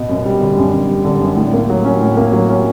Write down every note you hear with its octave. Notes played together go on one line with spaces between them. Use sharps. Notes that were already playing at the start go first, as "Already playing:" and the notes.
Already playing: B2
F#2
G3
D3
F#2
F#2
G3
D3
F#2
A2
A#3
F#3
C#4
A2
A#3
F#3
C#4